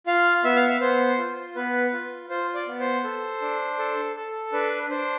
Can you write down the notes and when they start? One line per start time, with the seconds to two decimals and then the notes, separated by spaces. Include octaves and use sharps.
0.07 F4 F5
0.44 B3 E5
0.56 F5
0.69 E5
0.81 B3 C5
1.18 F4
1.56 B3 B4
1.93 F4
2.29 F4 C5
2.54 D5
2.67 B3
2.80 C5
3.04 A4
3.42 D4
3.79 A4
4.16 A4
4.52 D4 B4
4.90 D4 C5